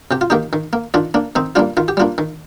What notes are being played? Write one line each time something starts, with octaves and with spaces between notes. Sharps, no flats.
C3 G4
F4
D#3 A#3 D#4 G4
D#3
A#3
D#3 D4 F4
A#3 D4
D#3 C4 D#4
G3 A#3 D4 F4
D#3 F4
G4
G3 A#3 D4 F4
D#3